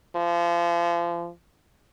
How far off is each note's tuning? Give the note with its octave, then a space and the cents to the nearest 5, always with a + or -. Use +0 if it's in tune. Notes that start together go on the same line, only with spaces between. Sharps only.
F3 -30